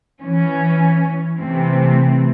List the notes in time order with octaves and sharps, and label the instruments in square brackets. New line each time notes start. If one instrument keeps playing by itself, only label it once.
[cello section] E3 C#4
C3 E3 A3 C4